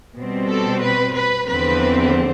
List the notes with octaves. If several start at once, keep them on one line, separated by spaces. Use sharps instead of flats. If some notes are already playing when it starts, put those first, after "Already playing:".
B2 G3 C4
A4
B4
B4
E2 D3 F3 C4 B4